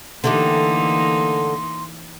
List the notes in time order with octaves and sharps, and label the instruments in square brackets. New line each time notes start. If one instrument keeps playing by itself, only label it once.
[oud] D3 A3 G4 [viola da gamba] E3 A#3 D#4 [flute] C6